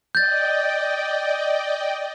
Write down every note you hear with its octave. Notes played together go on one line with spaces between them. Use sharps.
D5 D#5 G5 G6 A6